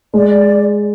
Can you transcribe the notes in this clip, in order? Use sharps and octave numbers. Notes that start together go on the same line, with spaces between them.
G#3 D5